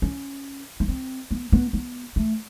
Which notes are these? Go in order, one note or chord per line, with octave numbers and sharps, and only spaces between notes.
C#4
B3
C4
B3
B3
B3
A3